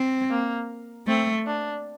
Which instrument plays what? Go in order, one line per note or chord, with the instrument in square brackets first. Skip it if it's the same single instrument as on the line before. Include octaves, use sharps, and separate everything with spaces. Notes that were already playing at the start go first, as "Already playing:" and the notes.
Already playing: [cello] C4
[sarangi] A#3
[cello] A3 [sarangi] C4
[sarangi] D4